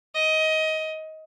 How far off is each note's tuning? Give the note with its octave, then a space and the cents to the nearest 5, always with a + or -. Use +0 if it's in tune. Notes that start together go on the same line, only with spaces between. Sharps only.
D#5 +20